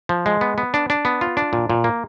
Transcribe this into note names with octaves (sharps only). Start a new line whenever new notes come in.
F3
G#3
B3
B3
D4
D4
B3
F4
D4
A#2
A#2
A#3